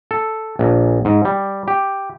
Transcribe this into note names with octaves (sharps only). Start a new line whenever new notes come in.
A4
A#1
G#2
G3
G4